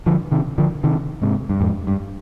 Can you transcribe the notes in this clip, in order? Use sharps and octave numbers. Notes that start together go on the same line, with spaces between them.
D3 F3
C3 D#3
D3 F3
C3 D#3
G#2 C3
G2
F2 G#2
G2